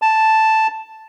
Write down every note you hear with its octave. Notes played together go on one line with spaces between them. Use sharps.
A5